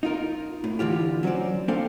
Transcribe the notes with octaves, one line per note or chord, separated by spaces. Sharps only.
D#4 F4 A#4
A2
D3 E3 F4 G4
F#3 C#4 A4 C5 D5
A#3 D4 A4 C5 F5 G5